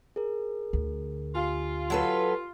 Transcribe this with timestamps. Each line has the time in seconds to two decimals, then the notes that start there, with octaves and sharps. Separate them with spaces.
0.16 G#4 A#4
0.73 D2
1.35 F4 G4 G#5
1.90 F#3 A4 B4